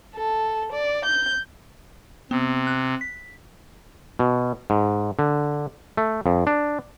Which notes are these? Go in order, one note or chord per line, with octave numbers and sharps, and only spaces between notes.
A4
D5
G6
C3 B3
F#6
B6
B2
G#2
D3
A3
F2
D4